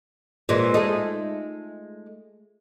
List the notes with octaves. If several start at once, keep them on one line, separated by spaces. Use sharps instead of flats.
A#2 E3 G#3
G#3 A3 D#4